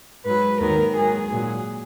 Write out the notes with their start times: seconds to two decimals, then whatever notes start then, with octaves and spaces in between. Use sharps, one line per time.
0.25 G#2 F#3 B4
0.60 D#2 D#3 F#3 A#4
0.96 G#2 D#3 F#3 G#4
1.32 A#2 F#3